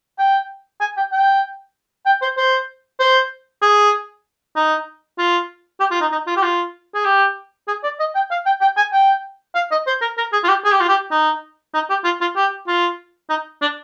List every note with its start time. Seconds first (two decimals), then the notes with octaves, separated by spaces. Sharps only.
0.18 G5
0.81 G#5
0.97 G5
1.12 G5
2.06 G5
2.22 C5
2.37 C5
3.00 C5
3.62 G#4
4.56 D#4
5.18 F4
5.80 G4
5.91 F4
6.01 D#4
6.12 D#4
6.27 F4
6.36 G4
6.42 F4
6.94 G#4
7.05 G4
7.67 G#4
7.83 D5
7.99 D#5
8.15 G5
8.31 F5
8.46 G5
8.61 G5
8.77 G#5
8.92 G5
9.55 F5
9.71 D#5
9.87 C5
10.01 A#4
10.17 A#4
10.33 G#4
10.43 F4
10.49 G4
10.64 G#4
10.72 G4
10.80 F4
10.88 G4
11.11 D#4
11.74 D#4
11.90 G4
12.04 F4
12.21 F4
12.36 G4
12.67 F4
13.29 D#4
13.61 D4